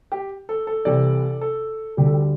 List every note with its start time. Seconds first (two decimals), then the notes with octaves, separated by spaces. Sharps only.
0.12 G4
0.49 A4
0.67 A4
0.85 C2 C3 E3 A4 D5
1.41 A4
1.97 D2 D3 G3 G4
2.06 A4
2.14 G4